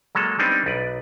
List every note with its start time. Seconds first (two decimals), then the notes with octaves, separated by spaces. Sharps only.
0.15 F#3 G#3 A#3 A4
0.39 G3 B3 C4 D4 D#4
0.66 B1 B4 D5